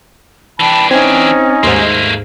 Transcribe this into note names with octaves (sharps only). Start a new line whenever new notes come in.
E3 D4 G5 A5 B5
C4 C#4 D#4 G#5 G#6
D#2 G#2 A3 A#3 C6